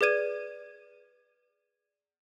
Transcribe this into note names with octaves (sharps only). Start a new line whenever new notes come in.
G#4 B4 D5 G#6 D#7